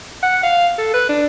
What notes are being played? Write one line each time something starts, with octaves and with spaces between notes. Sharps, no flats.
F#5
F5
A4
B4
D4